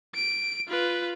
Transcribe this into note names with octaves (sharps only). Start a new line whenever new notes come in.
D7
F4 B4